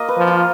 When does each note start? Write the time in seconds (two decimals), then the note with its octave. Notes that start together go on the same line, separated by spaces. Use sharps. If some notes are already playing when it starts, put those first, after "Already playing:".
Already playing: A#3 F4 D#5
0.08 B4
0.17 F3
0.28 F4